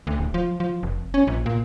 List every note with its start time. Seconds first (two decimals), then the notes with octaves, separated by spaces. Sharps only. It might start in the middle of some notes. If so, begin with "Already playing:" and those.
0.07 D2
0.18 D1
0.34 F3
0.60 F3
0.83 F1
1.14 C#4
1.27 A#1
1.46 A#2